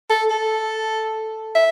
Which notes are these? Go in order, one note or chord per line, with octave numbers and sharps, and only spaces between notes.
A4
A4
E5